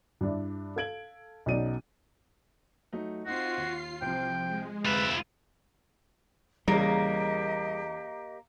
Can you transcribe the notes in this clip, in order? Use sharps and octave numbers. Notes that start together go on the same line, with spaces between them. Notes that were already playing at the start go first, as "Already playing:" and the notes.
G2 D4 E4
A4 F5 G#6 D7 F#7
B1 B2 C#4 D#4 D5 D#7
F#3 A3 D#4
C4 D#4 F4 F#4 C7
D#2
C2 F3 C4 G5
G#3
F1 D2 F4 B4 E5
E2 C#3 G3 A#3 G4 D#5